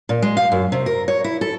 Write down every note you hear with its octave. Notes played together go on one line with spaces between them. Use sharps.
A#2
G#3
F5
F#2
C3
A#4
C#5
E4
A4